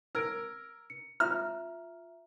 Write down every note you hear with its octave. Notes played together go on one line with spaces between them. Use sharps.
A#4 E6 G#6 D7
C#7
F4 E5 A#5 F6